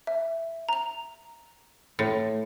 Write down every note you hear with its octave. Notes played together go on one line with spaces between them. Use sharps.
E5
A#5 F7
A2 D#3 A3